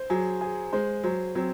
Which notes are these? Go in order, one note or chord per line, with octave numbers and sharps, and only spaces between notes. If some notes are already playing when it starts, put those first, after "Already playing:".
Already playing: C5
F#3 G#4
G#4
G#3 C5
F#3 C5
F#3 C4